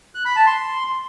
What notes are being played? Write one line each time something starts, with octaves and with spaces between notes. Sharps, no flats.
F#6
B5
A5
C6